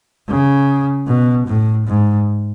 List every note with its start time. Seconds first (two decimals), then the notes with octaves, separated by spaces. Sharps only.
0.28 C#3
1.07 B2
1.47 A2
1.87 G#2